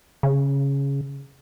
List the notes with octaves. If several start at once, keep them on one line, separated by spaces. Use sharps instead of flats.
C#3